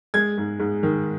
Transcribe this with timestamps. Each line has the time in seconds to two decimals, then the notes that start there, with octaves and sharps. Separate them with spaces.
0.14 G#3 G#6
0.38 G#2
0.60 G#2
0.83 D#3